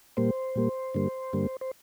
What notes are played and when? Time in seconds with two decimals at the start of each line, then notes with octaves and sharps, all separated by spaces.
0.17 A#2 G3 A#3 C5
0.55 A#2 G3 A#3
0.94 G2 D3 G3 A#3
1.33 G2 D3 G3 A#3
1.61 C5